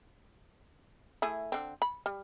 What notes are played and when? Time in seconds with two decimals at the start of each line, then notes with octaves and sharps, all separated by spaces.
1.22 A3 E4 G#4
1.52 D3 C4
1.82 B5
2.06 G3